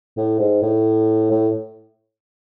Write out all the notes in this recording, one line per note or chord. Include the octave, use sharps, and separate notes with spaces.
A2
G#2
A2
A2